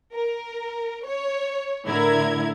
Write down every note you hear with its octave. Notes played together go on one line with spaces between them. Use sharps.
A#4
C#5
A2 D3 E4 A#4 G#6